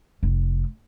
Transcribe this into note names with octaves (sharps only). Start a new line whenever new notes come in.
F1